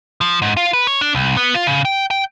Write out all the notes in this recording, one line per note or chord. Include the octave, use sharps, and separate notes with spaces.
F3
G#2
F4
B4
C#5
D4
C2
B3
F4
C#3
G5
G5